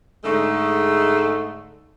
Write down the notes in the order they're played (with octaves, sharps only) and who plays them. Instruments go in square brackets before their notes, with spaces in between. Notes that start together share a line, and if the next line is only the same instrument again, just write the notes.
[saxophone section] G#2 D3 G#3 A3